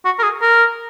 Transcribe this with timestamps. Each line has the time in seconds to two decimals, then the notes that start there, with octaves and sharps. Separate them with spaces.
0.05 F#4
0.19 A#4
0.23 G#4
0.42 A#4